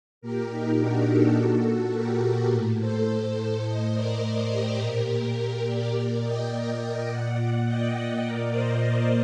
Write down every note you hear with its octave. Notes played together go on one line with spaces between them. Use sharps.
A#2 G4 A#4
D#4 G4
D4 F#4
F#4 A4
A#2
F#4 A4
G4 A#4
A2
A4 C5
A2 C5 D#5
A#4 D5
A#4 D5
G4 A#4
A#2
A#4 D5
A#2 A#4 D5
D#5 G5
A#2 D5 F#5
D#5 G5
D5 F#5
A#2 A#4 D5
C5 D#5